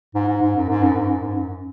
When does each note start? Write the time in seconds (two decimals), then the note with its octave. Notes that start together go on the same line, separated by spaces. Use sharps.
0.15 G#2
0.28 G#2
0.42 G#2
0.56 F#2
0.69 G#2
0.83 F#2
0.96 G#2
1.09 F#2
1.23 G#2
1.36 F#2